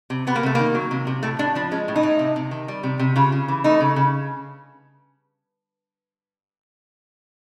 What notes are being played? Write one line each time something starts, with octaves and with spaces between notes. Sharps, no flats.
C3
C3 B3
A#3
C3 A3
D#3 A#3
F#3
C3
C3
A2 A3
A2 D4
F3 D4
G#3 C#4
A2
D#4
A2
C3
C3
D#3
G3
C3
C3
C#3 F4
C#3
E3
A3 D#4
C#3
C#3